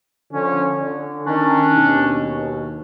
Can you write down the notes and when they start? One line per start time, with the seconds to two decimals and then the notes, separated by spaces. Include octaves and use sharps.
0.32 D3 F3 C#4
0.78 D3
1.27 D#3 C#4 D4
1.74 D#2 B2